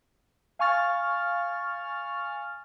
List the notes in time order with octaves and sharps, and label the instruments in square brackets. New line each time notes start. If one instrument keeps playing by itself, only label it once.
[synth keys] F5 G#5 C#6 F6 A6